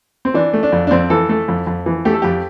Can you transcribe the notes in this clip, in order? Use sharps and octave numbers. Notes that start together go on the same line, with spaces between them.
C4
E3 D4
A3
D4
F2
D4
F2 C4
E3 A4
A3 A4
F2
F2
E3
A3 G4
A4
F2 G4